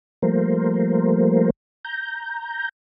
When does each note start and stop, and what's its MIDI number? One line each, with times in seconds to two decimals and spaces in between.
0.22 1.50 53
0.22 1.50 55
0.22 1.50 57
0.22 1.50 58
0.22 1.50 70
0.22 1.50 72
1.85 2.69 82
1.85 2.69 91